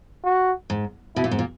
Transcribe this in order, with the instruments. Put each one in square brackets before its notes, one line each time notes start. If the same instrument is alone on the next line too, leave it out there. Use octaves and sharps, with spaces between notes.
[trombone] F#4
[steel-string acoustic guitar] G#2
[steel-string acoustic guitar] B2 [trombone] E4
[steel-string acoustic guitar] A#2
G#2
A#2